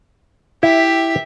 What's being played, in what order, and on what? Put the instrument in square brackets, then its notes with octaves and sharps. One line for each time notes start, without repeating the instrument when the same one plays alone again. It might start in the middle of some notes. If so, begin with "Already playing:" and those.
[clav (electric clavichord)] E4 [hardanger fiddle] G4 E5